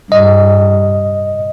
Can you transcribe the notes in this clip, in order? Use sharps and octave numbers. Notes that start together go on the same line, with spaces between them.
G2 D#5